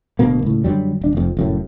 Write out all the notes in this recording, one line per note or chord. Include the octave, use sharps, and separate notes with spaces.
D1 D2 B2 A#3
C#2 A2
F#2 D3 F#3 G3
D#1 D4
F1 F2
F1 F#2 A2